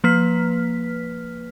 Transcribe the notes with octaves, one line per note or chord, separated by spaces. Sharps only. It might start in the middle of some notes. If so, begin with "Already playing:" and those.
F3 A#3 B4 F6 B6